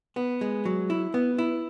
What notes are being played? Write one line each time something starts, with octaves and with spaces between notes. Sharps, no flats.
B3
G#3
F#3
E4
B3
E4